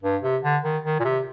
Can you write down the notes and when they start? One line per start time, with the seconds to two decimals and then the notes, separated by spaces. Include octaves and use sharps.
0.03 G2
0.23 C3
0.43 D3
0.64 D#3
0.84 D#3
1.00 A#2
1.05 C3